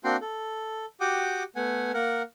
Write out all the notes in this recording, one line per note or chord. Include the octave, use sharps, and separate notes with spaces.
A#3 C4 D4 F#4 G5 C6
A4
F#4 G4 F#5 G5 D6 D#6
A3 B3 F#5 G#5
A#3 A#4 F#5